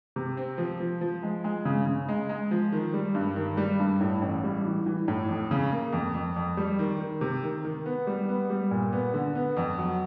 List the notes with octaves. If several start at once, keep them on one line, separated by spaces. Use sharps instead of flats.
C3
C4
F3
F3
F3
G#3
G#3
C#3
C#3
G#3
G#3
F3
D#3
G3
G2
D#3
G3
G2
A2
A1
G3
E3
E3
A2
F2
C#3
A#3
F2
F2
F2
G3
D#3
D#3
C3
D#3
D#3
B3
G3
B3
G3
A#2
B3
D3
B3
F2
F#3